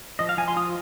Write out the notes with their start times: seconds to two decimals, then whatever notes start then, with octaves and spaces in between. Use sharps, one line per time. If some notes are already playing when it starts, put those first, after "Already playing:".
0.19 F3 D#5
0.29 F5
0.37 F3 G#5
0.48 C6
0.56 F4 D#6